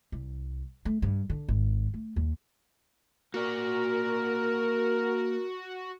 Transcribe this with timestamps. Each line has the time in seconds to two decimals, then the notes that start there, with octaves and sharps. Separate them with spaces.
0.12 C2
0.85 A3
1.02 G2
1.30 D3
1.48 G#1
1.94 A3
2.16 D#2
3.34 A#3 F#4 A#4 D5